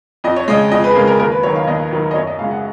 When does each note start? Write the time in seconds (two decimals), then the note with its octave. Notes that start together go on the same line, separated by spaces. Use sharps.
0.24 F2 D#5
0.36 C#5
0.48 C#3 G#3 D#5
0.71 F2 D#5
0.84 B4
0.91 G#4
0.95 C#3 G#3 A#4
1.07 A#4
1.20 D#2 A#4
1.32 B4
1.43 D#3 F#3 C#5
1.56 F5
1.67 D#2 D#5
1.91 D#3 F#3
2.11 D#5
2.15 F#2 C#5
2.27 D#5
2.39 C#3 G#3 F5
2.51 F#5